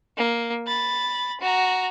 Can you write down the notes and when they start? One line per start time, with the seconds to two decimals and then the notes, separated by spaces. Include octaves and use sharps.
0.17 A#3
0.67 B5 A6
1.40 F#4 A#5